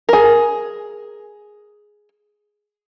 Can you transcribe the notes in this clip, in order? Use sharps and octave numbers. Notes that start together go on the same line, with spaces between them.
G#4 A#4